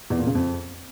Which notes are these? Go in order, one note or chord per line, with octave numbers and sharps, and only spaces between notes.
E2
A#2
C#3
F2